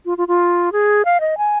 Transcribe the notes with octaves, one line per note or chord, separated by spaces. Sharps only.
F4
F4
F4
G#4
F5
D#5
G#5